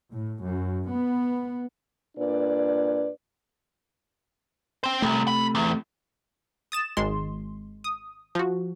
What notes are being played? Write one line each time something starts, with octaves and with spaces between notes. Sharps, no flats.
A2
F#2
B3
A#2 D4 B4 D5
C5 G5
C2 C3 A3
B5
E2
D#6 A6 E7
G#1 G#3 C6
D#6
F3 F#4